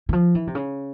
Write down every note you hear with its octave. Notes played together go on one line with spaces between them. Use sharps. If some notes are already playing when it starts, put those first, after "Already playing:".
E3
F3
E3
C3
C#3